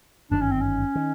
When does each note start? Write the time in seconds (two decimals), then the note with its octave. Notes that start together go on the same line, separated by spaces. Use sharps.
0.31 G1 F#2 D#3 D4
0.41 C#4
0.51 C4
0.61 C#4
0.95 D#3